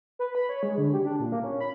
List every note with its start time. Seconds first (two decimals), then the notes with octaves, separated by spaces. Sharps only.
0.19 B4
0.35 B5
0.49 C#5
0.63 G#3
0.78 D3
0.93 G4
1.05 D4
1.20 A#2
1.32 A#3
1.44 C#4
1.61 B5